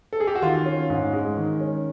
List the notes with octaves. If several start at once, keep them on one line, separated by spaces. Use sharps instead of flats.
A4
G#4
G4
F#4
D#3 F4
C#4
G#2
G#3
D#3
C#4